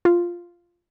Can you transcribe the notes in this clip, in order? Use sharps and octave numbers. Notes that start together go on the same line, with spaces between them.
F4